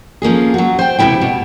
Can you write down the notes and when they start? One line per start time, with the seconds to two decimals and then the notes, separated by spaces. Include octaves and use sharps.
0.22 F3 A#3 C#4 G#4
0.54 F#3 F#4
0.79 C5 G5
0.99 E2 C3 F3 G#3 E4 G5
1.21 B2